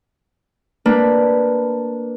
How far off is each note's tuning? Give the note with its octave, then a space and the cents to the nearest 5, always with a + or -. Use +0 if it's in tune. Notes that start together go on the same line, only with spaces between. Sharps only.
A#3 +0 D4 +0 B4 +0